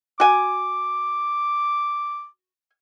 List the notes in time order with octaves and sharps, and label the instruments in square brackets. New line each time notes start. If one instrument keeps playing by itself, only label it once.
[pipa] F#4 G#5 [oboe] D6